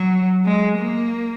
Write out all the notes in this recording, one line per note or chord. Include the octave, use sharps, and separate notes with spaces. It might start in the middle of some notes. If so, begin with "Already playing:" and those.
Already playing: F#3
G#3
A#3